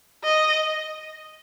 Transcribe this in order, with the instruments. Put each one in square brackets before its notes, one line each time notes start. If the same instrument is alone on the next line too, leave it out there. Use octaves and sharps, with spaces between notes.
[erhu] D#5